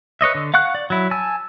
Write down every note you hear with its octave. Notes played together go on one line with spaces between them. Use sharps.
B4 C#5 D#5 E5
D3
F5 F#5 C#6 F#6
D5
F#3 E4
G#5 A5 E6